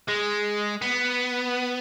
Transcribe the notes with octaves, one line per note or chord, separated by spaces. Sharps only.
G#3
B3